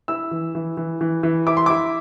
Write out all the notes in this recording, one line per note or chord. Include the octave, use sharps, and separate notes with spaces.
E4 E6
E3
E3
E3
E3
E3
E4 D6
C6
E4 D6